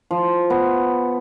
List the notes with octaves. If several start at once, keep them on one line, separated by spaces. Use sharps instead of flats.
F3
B3